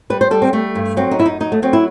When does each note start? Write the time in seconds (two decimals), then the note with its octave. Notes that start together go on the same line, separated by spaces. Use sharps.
0.10 G3 B4
0.21 C5
0.31 G3 A4
0.42 C4
0.53 G3 A3
0.75 G2
0.97 F#3 C4
1.11 D#4
1.19 F#2 E4
1.25 D#4
1.40 F#3 D#4
1.52 A3
1.62 F#3 C4
1.73 E4